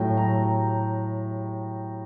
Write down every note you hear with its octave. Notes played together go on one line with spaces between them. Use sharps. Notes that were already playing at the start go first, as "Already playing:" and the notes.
Already playing: A2 F#3 A3 G5
A#5